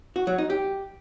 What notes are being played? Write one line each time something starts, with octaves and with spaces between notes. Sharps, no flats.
F#4
F#3
D#4
G4